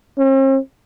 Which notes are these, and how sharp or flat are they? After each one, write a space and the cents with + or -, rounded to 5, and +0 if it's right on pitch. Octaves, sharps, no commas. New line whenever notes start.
C4 +45